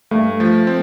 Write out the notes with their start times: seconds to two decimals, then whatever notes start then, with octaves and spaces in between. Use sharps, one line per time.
0.11 G2 A3
0.40 F3
0.67 C4